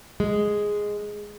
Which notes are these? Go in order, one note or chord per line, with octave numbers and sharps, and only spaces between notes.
G#3